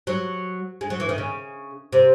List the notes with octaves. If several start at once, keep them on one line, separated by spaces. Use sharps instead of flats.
F#3
G#3
F#3
E3
D#3
C#3
C3